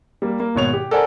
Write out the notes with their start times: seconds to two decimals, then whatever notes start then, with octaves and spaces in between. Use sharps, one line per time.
0.22 G3 A#3
0.40 A#3
0.55 G#1 B2 C#5 F7
0.74 G4
0.91 A4 A#4 C5 D5 F#5 G#5